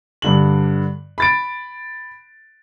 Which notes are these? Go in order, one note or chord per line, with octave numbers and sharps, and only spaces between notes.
G2 D3 F#7
B5 A6 D7